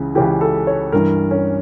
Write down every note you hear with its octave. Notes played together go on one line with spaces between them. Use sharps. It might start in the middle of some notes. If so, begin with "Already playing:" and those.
Already playing: C#2 C#3 E3
C#2 C#3 E3 G4
A4
C#5
G2 E3 A#4
C#4